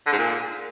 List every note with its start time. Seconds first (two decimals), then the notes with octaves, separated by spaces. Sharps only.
0.07 D3
0.12 G#2
0.18 A#2